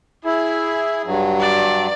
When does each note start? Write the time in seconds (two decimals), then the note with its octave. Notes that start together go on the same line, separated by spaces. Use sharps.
0.25 E4 G#4
1.05 G2 F#3
1.40 D5